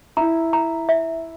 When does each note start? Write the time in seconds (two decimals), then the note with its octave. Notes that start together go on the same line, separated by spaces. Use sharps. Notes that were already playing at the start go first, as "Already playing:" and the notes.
0.17 E4 A#5
0.53 A#5
0.89 E5